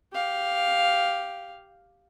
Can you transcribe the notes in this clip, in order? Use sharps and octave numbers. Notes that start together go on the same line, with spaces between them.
G4 F5